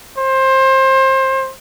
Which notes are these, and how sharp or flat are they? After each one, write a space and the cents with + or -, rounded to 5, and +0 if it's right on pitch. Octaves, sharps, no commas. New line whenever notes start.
C5 +25